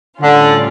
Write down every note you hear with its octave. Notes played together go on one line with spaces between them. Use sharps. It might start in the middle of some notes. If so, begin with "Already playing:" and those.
A2 D3 G3 C#4 F4